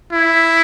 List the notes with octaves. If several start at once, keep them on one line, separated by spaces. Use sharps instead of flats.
E4